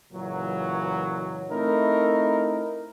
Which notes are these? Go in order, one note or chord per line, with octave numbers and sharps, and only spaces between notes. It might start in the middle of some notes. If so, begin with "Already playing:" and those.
C#2 A#2 E3 F#3
A3 C4 D#4 E4 A#4